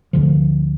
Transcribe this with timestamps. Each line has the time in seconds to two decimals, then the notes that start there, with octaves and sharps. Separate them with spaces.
0.13 D2 D3 F3